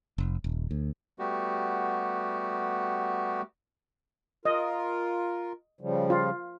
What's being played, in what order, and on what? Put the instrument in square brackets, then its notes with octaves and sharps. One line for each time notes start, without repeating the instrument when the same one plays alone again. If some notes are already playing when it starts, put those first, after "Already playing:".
[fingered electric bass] F1
D#1
D2
[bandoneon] G3 A3 B3 F#4 G4
[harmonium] F4 A#4 [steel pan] D#5
[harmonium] C#3 F3 G3
[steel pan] F4